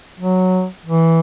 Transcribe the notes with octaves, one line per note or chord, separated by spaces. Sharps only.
F#3
E3